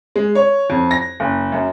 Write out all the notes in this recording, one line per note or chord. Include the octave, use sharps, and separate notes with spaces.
G#3
C#5
F2
A#6
F#1
F#2